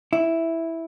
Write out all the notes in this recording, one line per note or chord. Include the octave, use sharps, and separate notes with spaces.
E4